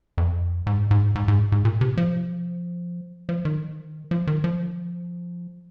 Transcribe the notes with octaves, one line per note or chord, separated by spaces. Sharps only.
F2
G#2
G#2
G#2
G#2
G#2
A#2
C3
F3
F3
D#3
F3
D#3
F3